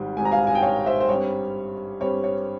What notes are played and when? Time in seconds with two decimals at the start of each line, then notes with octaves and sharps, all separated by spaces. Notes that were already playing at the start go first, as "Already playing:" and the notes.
Already playing: G#1 G#2 G3 C4
0.17 G#1 G#2 G3 C4 G#5
0.25 A#5
0.32 F5 G#5
0.47 G#5
0.55 G5
0.62 C#5 F5
0.86 C5 E5
1.00 C5
1.09 G2 G3 C4 C#5
2.00 G2 G3 C4 C#5
2.24 C#5